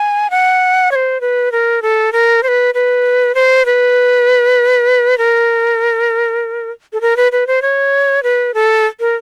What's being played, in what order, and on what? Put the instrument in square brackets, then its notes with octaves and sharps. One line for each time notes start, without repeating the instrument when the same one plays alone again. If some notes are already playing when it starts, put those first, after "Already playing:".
Already playing: [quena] G#5
F#5
C#5
C5
B4
A#4
A4
A#4
C5
B4
B4
C5
B4
A#4
A4
A#4
B4
B4
C5
C#5
B4
A4
A#4